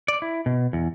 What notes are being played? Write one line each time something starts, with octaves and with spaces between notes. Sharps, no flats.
D5
E4
B2
E2